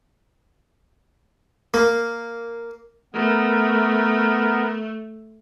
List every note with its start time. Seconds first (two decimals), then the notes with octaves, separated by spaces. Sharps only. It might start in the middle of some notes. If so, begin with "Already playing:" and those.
1.74 A#3
3.14 A3 B3 A#4